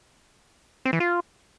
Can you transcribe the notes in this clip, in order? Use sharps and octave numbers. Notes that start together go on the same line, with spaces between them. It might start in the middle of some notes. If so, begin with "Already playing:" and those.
C4
E3
F4